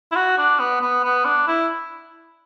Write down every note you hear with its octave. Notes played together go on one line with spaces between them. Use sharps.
E4
F#4
D4
B3
B3
B3
D4
E4